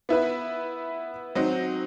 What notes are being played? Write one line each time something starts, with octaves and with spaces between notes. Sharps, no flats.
B3 E4 B4
F#3 C4 D#4